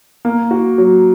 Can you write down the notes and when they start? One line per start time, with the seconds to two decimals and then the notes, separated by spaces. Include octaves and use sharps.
0.25 A#3
0.51 F#4
0.78 F#3